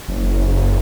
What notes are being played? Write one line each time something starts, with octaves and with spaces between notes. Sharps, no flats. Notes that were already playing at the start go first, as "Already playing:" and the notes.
F#1